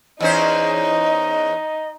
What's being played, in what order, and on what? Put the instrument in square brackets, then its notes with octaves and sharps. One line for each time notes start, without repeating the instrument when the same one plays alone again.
[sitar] E2 C#4 C5 [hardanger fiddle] D#4 [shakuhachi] D#5